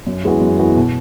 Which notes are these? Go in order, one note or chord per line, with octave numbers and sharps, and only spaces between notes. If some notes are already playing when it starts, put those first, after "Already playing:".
F#2
E3 G#3 B3 F#4
F#2
E3 G#3 B3 F#4
B2